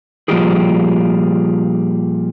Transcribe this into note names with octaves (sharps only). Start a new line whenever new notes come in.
A#2 F3 G3 F4 G4 G#4